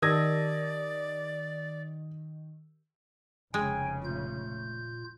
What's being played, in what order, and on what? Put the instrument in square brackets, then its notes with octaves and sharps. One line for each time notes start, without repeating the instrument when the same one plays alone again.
[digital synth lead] D#3 [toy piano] G4 A#4 A5 [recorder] D5 [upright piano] D#6 G#6 A#6
[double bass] F1 C#3 [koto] G#3 [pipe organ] G5 [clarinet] G#5
[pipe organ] A#2 F4 G6 [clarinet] A3